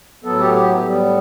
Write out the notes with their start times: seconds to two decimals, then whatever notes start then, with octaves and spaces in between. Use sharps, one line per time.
0.24 A2 F#3 B3 A4
0.40 G4
0.54 G4
0.85 A2 G3 B3